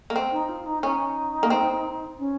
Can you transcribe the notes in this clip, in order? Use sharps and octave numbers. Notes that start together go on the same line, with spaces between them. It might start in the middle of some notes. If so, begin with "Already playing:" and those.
A#3
C4
D#4
F4
D#4
C#4 D#4
A#3
C4
C#4